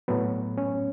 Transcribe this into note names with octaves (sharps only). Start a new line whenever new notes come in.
A2 F#3 B3
C#4